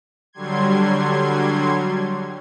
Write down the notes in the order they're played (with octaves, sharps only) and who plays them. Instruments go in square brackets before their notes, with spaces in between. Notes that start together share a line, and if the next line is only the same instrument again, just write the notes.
[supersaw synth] D3 F#3 G3 C6 G#6